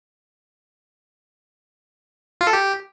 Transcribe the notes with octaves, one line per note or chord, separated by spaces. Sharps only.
F4
A4
G4